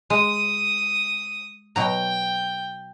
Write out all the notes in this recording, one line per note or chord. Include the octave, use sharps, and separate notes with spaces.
G#3 D#6
B2 F#3 G5 A#5